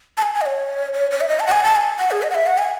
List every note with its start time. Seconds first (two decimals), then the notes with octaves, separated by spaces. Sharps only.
0.17 A5
0.22 G#5
0.34 G#5
0.41 D#5
0.46 C#5
0.93 C#5
1.11 C#5
1.21 E5
1.28 D#5
1.40 A5
1.47 F#5
1.52 G#5
1.64 A5
1.76 G#5
1.99 F#5
2.11 G#4
2.22 D#5
2.30 F#5
2.35 E5
2.47 F#5
2.58 G#5